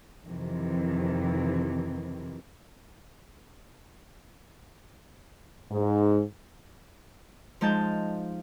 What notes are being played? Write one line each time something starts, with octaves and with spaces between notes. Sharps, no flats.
F2 C3 D#3 E3
G#2
F3 G#3 D#4 A5 G6